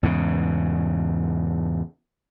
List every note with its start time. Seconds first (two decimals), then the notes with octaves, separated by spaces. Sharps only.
0.03 E2 G#2 C#3